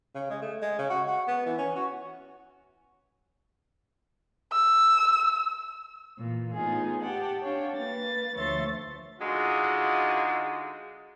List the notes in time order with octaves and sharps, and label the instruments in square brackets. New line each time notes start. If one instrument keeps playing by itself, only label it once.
[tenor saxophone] C#3
G#3
A3
G#3
C#3
F#4
F#4
B3
E3
C#4
F#4
[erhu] E6
[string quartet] A#2 E3
A2 B3 D#4 F4 G#4
G4 F#5 G5 A5
D4 C#5 F5 G5
A#3 B4 A6
D2 F3 C#5 E5 C6 A6
[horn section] D3 G#3 D#4 F4 F#4